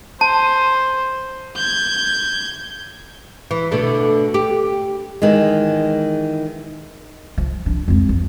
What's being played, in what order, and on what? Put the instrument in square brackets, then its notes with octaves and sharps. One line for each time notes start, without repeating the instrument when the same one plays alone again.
[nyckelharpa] C5 [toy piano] A5
[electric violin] G6 G#6
[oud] E3
B2 D3 A3
G4
[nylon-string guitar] D#3 E3 G#3
[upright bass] F3
D4
F2 G#3
E3